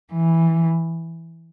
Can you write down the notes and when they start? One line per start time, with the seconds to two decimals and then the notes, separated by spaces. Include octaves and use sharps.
0.13 E3